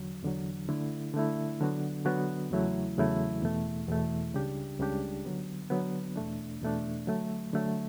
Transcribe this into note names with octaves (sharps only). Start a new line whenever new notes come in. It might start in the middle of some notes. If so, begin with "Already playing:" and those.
Already playing: E2 D3 F#3
E2 D3 F#3
D3 A3 E4
D3 A3 E4
D3 F#3 B3 F#4
D3 F#3 B3 F#4
E2 C#3 F#3 A3 E4
E2 C#3 F#3 A3 E4
E2 B2 A3
E2 B2 A3
C#2 C#3 G3 D4 G4
C#2 C#3 G3 D4 G4
D3 F#3 B3
D3 F#3 B3
E2 B2 A3 D4
E2 B2 A3 D4
D3 F#3 A3
D3 F#3 A3